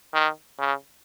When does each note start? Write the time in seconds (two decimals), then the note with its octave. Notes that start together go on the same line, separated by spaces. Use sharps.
0.14 D#3
0.59 C#3